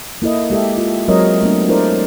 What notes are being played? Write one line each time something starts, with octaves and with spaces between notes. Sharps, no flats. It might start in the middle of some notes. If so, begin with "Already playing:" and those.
A#3 E4 A4 D#5
G#3 G4 A4 E5
F4
F#3 G#3 C4 A#4 C#5 D#5
A3 B3 D4
D4 E4 A4 A#4 C5 D5